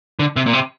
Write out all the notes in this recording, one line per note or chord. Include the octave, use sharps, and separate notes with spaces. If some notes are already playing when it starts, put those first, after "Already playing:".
D3
C3
A#2
C3